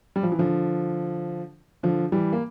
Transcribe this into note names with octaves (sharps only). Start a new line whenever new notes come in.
G3
F3
E3
D3 F3
D3 F3
E3 G3
A#3